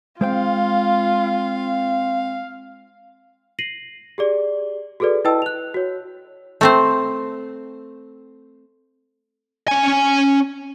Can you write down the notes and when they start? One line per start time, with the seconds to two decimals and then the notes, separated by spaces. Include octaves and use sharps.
0.21 G#3 C4 F4 C5 F5 G5
3.59 A#6 C7 D#7 F#7
4.18 G4 G#4 D5
5.00 F#4 G#4 A4 B4 D5
5.25 E4 B4 D#5 G5 A5 E6
5.42 F#6 F7
5.74 F#4 C#5
6.61 A3 C4 C5
9.68 C#4 G#5